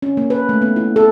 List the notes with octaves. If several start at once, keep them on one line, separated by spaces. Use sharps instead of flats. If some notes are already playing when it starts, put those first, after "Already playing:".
C#4
A#3
B4
A3
B3
E4
A4